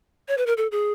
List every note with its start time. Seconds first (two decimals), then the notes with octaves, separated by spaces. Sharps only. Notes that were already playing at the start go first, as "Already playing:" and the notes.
0.28 C#5
0.37 B4
0.47 A#4
0.57 A4
0.72 G#4